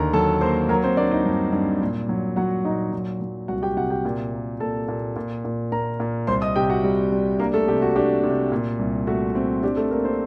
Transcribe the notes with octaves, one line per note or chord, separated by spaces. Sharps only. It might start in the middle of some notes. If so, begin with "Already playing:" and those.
Already playing: D#2 D3 A#4 A#5
F#3 A4 A5
A#3 C5 C6
F#3 A#4 A#5
C4 C5
A#3 D4 D5
D#4 D#5
G2
G2
A#2
F#3
F#3 F#4 F#5
A#2 D#4 D#5
F#3
F#3
C2 F#4 F#5
G4 G5
C3 F#4 F#5
G4 G5
A#2
A#3
A#2 A4 A5
A#2
A#2
A#2
A#2 A#4 A#5
A#2
C2 C5 C6
D#5 D#6
C3 G4 G5
F#4 F#5
G3
G3
A#3 D4 A#4
A3 A4
C3 G4
F#4
D4 G4
C3
A#2
C2
A3 F#4
C4
D4 G4
A3 A4
A#3 D4 A#4
C4 C5